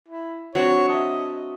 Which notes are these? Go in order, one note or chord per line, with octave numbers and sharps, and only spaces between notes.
E4
F#3 C4 D4 F#4 C#5
D#5 E5 A5